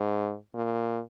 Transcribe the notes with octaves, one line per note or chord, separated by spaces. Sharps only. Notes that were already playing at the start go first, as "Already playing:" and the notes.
Already playing: G#2
A#2